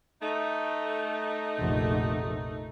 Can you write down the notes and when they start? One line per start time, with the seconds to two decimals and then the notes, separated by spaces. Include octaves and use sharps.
0.21 A3 D#4
1.59 F1 A#1